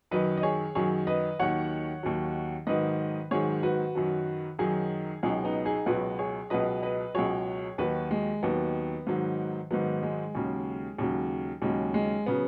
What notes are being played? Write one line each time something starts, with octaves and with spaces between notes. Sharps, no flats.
F#2 D#3 F#3 B4 D#5
D#5
G#4 C#5
F#2 D#3 F#3 G#4 C#5
B4 D#5
D#2 D#3 F#3 C#5 F#5
D#2 D#3 F#3
G#2 D#3 F#3 B4 D#5
G#2 D#3 F#3 G#4 C#5
F#4 B4
F#2 D#3 F#3
F#2 D#3 F#3 D#4 G#4
C#2 B2 F#3 D#4 G#4
B3 D#4
D#4 G#4
C#2 B2 F#3 F#4 B4
G#4 C#5
C#2 B2 F#3 B4 D#5
B4 D#5
C#2 B2 F#3 G#4 C#5
D#2 D#3 F#3 F#4 B4
G#3
D#2 D#3 F#3 B3
G#2 D#3 F#3
G#2 D#3 F#3 B3
G#3
D#2 C#3 F#3
D#2 C#3 F#3
D#2 C#3 F#3 G#3
G#3
C#3 F#3 B3